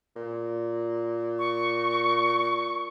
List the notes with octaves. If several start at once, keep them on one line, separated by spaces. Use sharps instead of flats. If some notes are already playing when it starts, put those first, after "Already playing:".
A#2
C#6